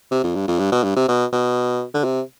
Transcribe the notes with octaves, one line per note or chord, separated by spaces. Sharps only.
C3
F2
G2
F2
G2
B2
G2
C3
B2
B2
D3
C3